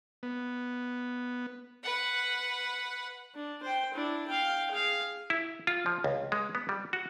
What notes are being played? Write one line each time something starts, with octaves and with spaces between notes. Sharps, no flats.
B3
B4 F#5
D4
C5 G5
D4 E4
F5 G5
G#4 F5
E4
F4
F3
C#2
G#3
B3
G3
F#4